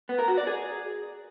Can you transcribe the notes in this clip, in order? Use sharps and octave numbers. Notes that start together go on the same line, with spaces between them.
B3
A#4
F#4
D5
G#4